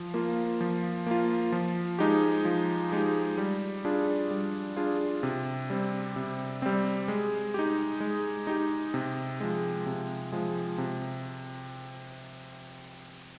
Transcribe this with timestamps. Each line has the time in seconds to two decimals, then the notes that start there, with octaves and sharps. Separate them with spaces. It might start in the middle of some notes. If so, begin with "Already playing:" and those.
Already playing: F3
0.14 A#3 F4
0.61 F3
1.07 A#3 F4
1.52 F3
1.99 G#3 D#4 G4
2.45 F3
2.92 G#3 D#4 G4
3.38 G3
3.85 D4 F4 G#4
4.31 G3
4.76 D4 F4 G#4
5.23 C3
5.70 G3 C4
6.16 C3
6.62 G3 C4
7.08 G#3
7.54 D#4 G4
8.00 G#3
8.47 D#4 G4
8.94 C3
9.40 F3 G#3
9.86 C3
10.32 F3 G#3
10.78 C3